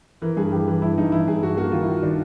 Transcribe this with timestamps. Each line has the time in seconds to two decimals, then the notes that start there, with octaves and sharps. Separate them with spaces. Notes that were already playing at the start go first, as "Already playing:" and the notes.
0.22 E3 A#4
0.37 G2 G#4
0.52 E3 G4
0.68 E3
0.82 G2 E4
0.98 G2 D#4
1.12 E3 E4
1.27 G2 G#4
1.42 G2 F#4
1.57 A#3 F#4
1.72 D#3 F4
1.82 E4
1.87 D#3
2.02 D#3 D4